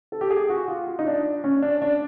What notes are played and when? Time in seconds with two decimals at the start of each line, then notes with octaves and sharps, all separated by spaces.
0.12 A4
0.21 G4
0.30 G#4
0.50 F#4
0.68 F4
0.87 F4
0.99 D#4
1.07 D4
1.44 C#4
1.62 D4
1.82 D4